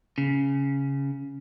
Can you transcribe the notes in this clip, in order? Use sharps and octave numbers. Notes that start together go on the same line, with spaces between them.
C#3